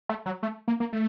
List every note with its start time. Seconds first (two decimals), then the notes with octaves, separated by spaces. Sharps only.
0.09 A3
0.26 F#3
0.43 A3
0.68 A#3
0.80 A#3
0.93 A3